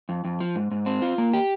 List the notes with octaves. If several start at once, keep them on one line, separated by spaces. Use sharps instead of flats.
F2
F2
F3
G#2
G#2
C4
F4
A#3
G4